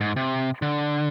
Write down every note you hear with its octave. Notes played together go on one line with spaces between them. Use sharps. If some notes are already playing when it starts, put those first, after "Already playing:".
G#2
C3
D3